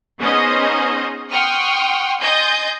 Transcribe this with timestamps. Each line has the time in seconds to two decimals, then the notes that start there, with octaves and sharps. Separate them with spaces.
0.20 B3 C#4 D#4 G#4 C5 D#5
1.32 F#5 G5 C6 C#6 D#6 F6
2.20 D#5 G#5 C6 G6 A6